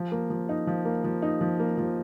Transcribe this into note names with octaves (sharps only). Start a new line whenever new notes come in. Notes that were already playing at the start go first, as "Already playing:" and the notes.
Already playing: F3
A#3
F3
D#4
F3
A#3
F3
D#4
F3
A#3
F3